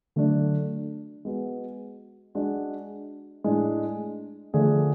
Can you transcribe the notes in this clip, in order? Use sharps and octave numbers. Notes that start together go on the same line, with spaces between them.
D3 F#3 A3 D4
G#3 B3 F#4
G#3 D4 F#4
A2 G#3 D4
D3 F3 A3 D4 G#4